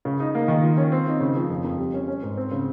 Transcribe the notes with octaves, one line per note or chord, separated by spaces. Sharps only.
C#3
D#4
A#3
D#3
F4
C#4
C4
D#4
C#3
F3
F2
F2
G3
C#4
C#4
G#2
C4
C#3